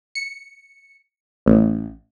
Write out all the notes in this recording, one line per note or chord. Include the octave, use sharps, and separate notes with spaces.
C#7
A1